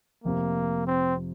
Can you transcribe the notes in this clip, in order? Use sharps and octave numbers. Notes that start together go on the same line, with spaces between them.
F1 F2 C3 A#3
C4